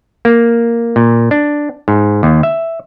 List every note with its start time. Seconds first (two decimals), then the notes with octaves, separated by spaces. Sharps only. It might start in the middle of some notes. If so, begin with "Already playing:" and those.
0.25 A#3
0.96 A#2
1.31 D4
1.88 G#2
2.23 D#2
2.43 E5